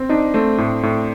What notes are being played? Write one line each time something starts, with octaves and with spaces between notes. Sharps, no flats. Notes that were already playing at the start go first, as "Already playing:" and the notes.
Already playing: C4
D4 D#4
A3 C4
A2
A2